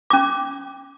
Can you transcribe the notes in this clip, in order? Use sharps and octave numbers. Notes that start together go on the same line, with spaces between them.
C#4 D6